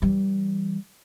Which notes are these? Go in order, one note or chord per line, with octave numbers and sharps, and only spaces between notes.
E3 G3